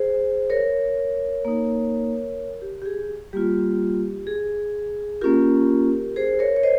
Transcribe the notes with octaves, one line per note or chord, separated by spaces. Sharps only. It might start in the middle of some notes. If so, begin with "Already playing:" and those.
Already playing: G#4 C5
A#4 C#5
A#3 D#4
G4
G4
G#4
G3 A#3 F4 G4
G#4
A#3 C#4 F4 G4 A#4
G#4 C5
A#4 C#5
C#5
C5 D#5